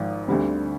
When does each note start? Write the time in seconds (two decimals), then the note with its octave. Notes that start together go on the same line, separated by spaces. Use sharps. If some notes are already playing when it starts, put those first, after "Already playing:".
Already playing: G#1 G#2 F3
0.27 D2 D3 G3 C4